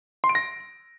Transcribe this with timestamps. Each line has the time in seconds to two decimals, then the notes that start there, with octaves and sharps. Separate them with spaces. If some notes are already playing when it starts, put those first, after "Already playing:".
0.24 C6
0.29 D7
0.35 A#6